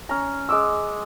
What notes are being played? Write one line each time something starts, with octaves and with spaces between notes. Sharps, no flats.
C#4 A#5
G#3 D6 E6